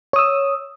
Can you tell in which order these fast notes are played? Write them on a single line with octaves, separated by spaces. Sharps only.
C#5 D#6 E6